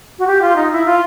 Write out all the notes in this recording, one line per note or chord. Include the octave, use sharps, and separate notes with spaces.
F#4
G4
F4
D#4
E4
F4